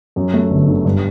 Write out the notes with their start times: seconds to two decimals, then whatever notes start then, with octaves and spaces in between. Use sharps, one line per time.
0.16 F#2
0.33 A3
0.50 G1
0.68 D3
0.85 G2